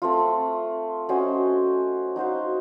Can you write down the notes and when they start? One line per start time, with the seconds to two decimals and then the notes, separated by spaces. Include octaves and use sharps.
0.02 A3 C4 F4
1.09 C#4 F#4 C5 D#5
2.16 D#4 F#4 C5 F5